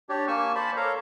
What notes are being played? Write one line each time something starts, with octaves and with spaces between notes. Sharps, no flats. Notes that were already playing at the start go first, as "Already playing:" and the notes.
D4 G4 C#5 D5
A#3 G#5 C#6 E6
C5 D5 A5 B5
A4 A#4 C#5 F5 A#5